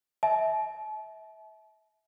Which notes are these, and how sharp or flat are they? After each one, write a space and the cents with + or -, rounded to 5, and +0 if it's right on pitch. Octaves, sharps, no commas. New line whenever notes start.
E5 -25 A5 -40